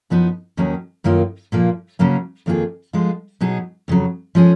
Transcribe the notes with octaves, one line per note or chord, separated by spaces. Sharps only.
F#2 F3 B3 D#4
D#2 D#3 F#3 A#3 C#4
F#2 D#3 A#3 F4
A#2 F3 A#3
C#3 F#3 A#3 C#4
F2 D#3 A#3 F4 G#4
F3 G#3 B3 F4
B2 F#3 B3 D#4 G#4
F2 C#3 F#3
F3 G#3 C#4 G#4